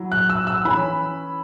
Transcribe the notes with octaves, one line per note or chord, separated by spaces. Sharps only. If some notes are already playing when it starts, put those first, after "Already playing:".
Already playing: F#3 E4
F#6
E6
E6
E3 C#4 E4 B5